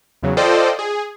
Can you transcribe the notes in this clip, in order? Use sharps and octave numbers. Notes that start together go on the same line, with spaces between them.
E2 C#3 F#3
F4 A4 C5 D5 D#5 G5
G#4